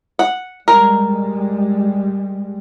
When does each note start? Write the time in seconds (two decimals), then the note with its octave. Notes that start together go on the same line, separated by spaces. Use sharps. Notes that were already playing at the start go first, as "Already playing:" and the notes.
0.19 F#5
0.68 G3 G#3 A#4